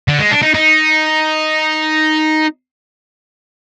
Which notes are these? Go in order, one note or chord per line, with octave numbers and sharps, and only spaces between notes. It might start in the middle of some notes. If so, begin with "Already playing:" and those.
D3
G#3
D4
D#4
D#4